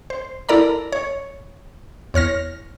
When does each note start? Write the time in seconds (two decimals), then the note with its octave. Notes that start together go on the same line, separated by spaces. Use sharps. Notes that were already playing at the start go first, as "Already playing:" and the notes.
0.10 C5
0.49 E4 A4 A#4 D5 A#5 B5
0.92 C#5
2.14 E2 C#5 F6 A#6